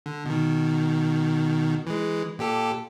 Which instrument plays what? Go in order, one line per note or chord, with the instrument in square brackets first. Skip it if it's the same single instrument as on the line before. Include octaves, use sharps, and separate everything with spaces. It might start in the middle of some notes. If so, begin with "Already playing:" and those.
[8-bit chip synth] D3
B2 D#3
E3 G#3
A#2 G4 A4